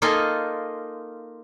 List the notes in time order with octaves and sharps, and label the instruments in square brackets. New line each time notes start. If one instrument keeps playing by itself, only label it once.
[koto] A#3 D#4 F4 A4 D#5 G#5